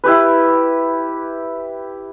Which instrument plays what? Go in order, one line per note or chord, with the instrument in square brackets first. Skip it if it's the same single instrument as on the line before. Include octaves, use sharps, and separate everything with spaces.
[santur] E4 G4 B4